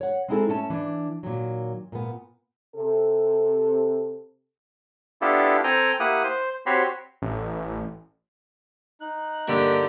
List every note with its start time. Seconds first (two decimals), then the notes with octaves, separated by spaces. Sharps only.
0.01 C#5 F#5
0.28 G#3 C4 D#4 E4 G#4 A4
0.49 A3 C#4 A5
0.70 E3 D4
1.23 A#2 D#3 F#3
1.92 A#2 B3
2.75 C3 A4
5.21 B3 D4 E4 F4 G4 A4
5.64 C4 A4 G5 G#5 A#5
6.00 A#3 E4 G4 F#5 D#6
6.24 C5
6.66 C4 F#4 G4 C#5 B5 C6
7.22 A1
9.01 D#4 F#6
9.48 G2 D3 A#3 G4